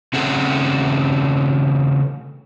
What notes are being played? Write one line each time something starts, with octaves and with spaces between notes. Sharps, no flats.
C#3 A3 C4 G#4 A4 F#5